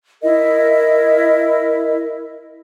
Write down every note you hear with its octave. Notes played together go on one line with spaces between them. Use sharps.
E4 A#4 D#5